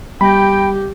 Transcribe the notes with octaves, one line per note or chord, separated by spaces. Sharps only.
G3 G4 G5 B5 A#6